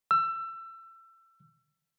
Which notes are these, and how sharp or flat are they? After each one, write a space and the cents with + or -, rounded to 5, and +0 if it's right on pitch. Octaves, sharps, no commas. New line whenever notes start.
E6 +25